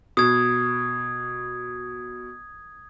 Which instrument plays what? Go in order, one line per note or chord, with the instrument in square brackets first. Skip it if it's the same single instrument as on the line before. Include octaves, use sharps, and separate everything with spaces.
[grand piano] B2 [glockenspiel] D#6 G#6